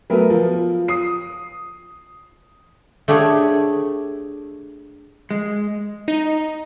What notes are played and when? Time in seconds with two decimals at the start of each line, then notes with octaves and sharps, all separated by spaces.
0.10 F#3 A3 B3 A#4 B4
0.30 F3
0.88 D#6 C7
3.08 A3 D4 G4 G#4 C#5
5.31 G#3
6.08 D#4